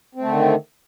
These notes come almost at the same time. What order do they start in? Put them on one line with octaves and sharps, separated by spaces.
C4 A3 D3 D#3